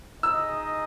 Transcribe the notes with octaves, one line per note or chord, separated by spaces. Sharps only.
D#4 G#4 D#5 E6